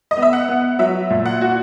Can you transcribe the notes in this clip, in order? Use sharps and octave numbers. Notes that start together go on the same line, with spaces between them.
D#5
B3
E5
F#5
B3
F#3 E5
A#2
F#5
F#4